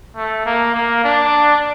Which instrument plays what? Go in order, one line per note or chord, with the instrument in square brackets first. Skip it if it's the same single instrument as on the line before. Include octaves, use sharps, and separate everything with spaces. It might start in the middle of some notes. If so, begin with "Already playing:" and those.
[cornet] A3
A#3
A#3
D4